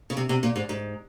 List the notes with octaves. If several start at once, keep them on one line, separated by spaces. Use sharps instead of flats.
C#3
C3
C3
A#2
G#2
G#2